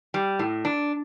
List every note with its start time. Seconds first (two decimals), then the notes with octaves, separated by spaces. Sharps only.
0.14 G3
0.39 A2
0.65 D4